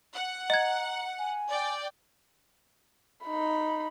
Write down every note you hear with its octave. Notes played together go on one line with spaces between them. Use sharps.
F#5
D#5 A#5 G#6
G#5
D5 G5
D#4 B5